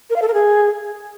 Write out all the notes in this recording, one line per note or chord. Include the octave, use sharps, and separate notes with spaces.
A#4
F5
A4
A#4
G#4